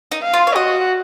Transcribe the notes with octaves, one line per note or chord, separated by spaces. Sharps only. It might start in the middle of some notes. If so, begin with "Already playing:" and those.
D#4
F5
F4
C#5
F#4 D#5